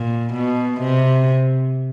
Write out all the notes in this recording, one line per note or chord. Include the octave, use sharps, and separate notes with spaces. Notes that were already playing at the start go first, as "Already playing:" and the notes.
Already playing: A#2
B2
C3